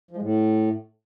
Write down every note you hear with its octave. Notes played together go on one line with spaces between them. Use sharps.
F3
G#3
A2